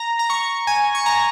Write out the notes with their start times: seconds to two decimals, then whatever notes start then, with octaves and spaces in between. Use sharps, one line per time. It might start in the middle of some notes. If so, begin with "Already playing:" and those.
Already playing: A#5
0.19 A#5
0.30 C#6
0.67 G#5
0.95 C#6
1.06 A#5